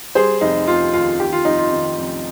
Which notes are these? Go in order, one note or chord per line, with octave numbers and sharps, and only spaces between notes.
G3 G#4 C5
F1 D#4
F1 F4
D#2 F4
D#2 G4
F4
F1 D#4
F4
D#3
F1